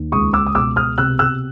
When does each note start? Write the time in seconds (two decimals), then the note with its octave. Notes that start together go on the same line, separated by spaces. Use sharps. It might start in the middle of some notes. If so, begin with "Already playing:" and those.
Already playing: D#2
0.12 C#2 C#6 D#6
0.33 D6 E6
0.46 D#6
0.55 B2 D6 E6
0.76 D#6 F6
0.98 C3 E6 F#6
1.19 E6 F#6